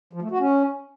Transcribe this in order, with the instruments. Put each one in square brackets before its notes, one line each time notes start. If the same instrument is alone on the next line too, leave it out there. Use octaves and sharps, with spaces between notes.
[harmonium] F3
A3
F#4
C#4